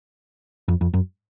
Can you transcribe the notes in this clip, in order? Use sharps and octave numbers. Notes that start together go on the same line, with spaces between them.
F2
F2
F#2